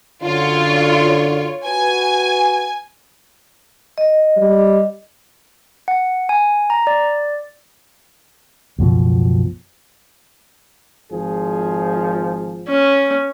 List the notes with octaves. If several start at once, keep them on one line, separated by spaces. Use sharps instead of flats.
F#2 D3 F4 C#5
F#4 B4 G#5
D#5
G3
F#5
G#5
A#5
D5
C#2 F#2 B2 F3
G#1 F3 G#4
C#4